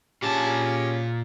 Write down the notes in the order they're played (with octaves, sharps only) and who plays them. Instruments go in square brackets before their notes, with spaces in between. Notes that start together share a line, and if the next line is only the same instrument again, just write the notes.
[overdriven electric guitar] A#2 A5 [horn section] C#4 G4 G#4